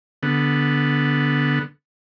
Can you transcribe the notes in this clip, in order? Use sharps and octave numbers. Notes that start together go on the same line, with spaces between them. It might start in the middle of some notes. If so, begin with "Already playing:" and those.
D3 B3